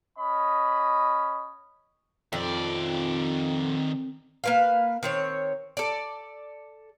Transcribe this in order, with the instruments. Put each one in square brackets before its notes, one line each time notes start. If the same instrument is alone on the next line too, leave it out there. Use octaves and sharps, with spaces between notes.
[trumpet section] C#4 D#5 B5
[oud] F2 [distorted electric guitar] D#3 D5
[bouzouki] A#3 B4 F5
D#3 C4 C#5
A4 D5